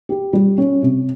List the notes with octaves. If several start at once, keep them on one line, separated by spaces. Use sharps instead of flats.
G4
G3
C#4
C3